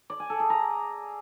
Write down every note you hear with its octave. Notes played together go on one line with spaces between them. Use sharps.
D5
G#5
A4
G#4
A#5